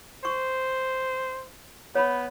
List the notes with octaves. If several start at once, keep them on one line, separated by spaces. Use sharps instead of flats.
C5 C#6
B3 C#5 B5